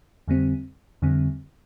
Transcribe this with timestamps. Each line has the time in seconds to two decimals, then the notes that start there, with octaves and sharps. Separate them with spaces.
0.28 F2 D3 G3 C4
1.02 F2 D3 G3 C4